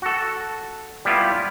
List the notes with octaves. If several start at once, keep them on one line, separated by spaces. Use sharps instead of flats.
F#4 A4
G3 B3 E4 F4 G4